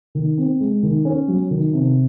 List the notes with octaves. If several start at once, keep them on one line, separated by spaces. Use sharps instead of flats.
D#3
C4
G#3
D#3
C#4
F#3
D#3
C3